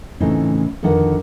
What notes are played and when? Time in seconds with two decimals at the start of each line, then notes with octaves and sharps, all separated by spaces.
0.20 A2 C#3 E3 A3 C4 D#4
0.83 F2 D3 D#3 B4 F#5